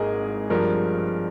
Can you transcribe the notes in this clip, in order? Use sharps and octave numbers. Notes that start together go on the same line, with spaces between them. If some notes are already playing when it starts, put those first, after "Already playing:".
Already playing: G#1 G#2 A#3 G#4 A#4 D#5
G2 F3 G#3 A#4